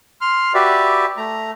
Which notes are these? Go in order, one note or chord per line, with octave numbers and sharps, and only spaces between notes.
C6 F6
F#4 G4 B4 D5 E5
A3 A#5